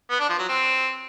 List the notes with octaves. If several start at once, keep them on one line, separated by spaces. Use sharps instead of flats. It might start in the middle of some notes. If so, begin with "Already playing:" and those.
B3
D4
F3
F#3
C4